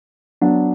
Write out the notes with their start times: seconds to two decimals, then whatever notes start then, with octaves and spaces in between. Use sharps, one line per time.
0.41 F#3 B3 D4